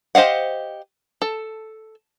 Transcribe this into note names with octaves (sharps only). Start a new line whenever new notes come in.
G4 C5 D#5 F5 F#5
A4